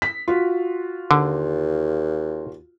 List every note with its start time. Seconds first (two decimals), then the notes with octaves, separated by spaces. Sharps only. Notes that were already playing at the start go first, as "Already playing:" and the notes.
0.02 B6
0.28 F4 F#4
1.11 D#2 D3